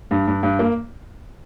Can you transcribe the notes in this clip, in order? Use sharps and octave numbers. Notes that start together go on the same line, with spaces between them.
G2
G2
G2
A#3